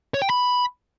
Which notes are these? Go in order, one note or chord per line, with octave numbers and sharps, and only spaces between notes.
C#5
G5
B5